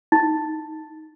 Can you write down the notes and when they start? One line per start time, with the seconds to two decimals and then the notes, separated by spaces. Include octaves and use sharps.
0.12 D#4